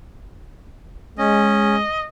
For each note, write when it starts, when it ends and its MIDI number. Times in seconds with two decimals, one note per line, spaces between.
1.19 1.81 56
1.19 1.76 61
1.19 2.05 75